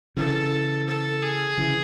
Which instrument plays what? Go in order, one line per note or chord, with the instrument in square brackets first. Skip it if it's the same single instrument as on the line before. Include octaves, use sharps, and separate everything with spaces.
[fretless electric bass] C#3 E3 [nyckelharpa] A4
[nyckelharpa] A4
G#4
[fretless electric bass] C#3 E3